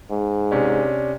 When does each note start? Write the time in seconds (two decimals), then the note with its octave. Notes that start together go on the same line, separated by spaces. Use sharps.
0.10 G#2
0.51 C3 C#4 D4